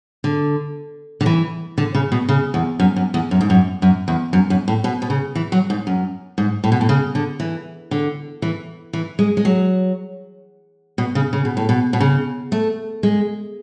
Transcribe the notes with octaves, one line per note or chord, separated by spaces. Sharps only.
D3
D3
E3
D3
C#3
B2
C#3
E2
F#2
F#2
E2
F#2
G#2
F#2
F#2
E2
F#2
F#2
A2
B2
B2
C#3
E3
F#3
G#2
F#2
G#2
A2
B2
A2
C#3
D3
E3
D3
E3
E3
G#3
G#3
F#3
B2
C#3
C#3
B2
A2
B2
B2
C#3
A3
G#3